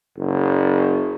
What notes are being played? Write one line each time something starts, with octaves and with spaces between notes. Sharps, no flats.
F#1